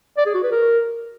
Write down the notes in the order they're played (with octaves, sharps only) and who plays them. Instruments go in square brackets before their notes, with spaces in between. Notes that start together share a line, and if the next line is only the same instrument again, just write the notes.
[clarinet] D5
G#4
F#4
B4
A#4